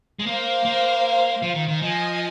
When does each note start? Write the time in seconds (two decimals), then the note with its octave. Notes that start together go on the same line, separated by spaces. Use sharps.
0.19 G#3
0.26 A#3 C5 F5
0.65 A#3
1.42 F3
1.55 D#3
1.68 D#3
1.81 F3 D#5 G#5